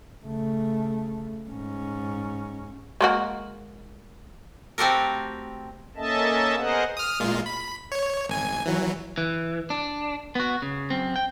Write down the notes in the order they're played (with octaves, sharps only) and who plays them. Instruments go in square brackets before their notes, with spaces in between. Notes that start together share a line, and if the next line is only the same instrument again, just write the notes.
[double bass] C#3 A3
G#2 C#4
[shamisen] G#3 A#3 F#4
[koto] A3 C4 F#4 G4 A4 A#4
[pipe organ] A#3 C#4 A4 D#5 E5 A5
B3 G#4 A#4 C5 D#5 F#5
[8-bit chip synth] D#6 F6
A#2 G#3 F4
B5
C#5
G#1 G#5
E3 F#3
[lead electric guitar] E3
D4
B3 F#4
C#3
F#2 C4
G5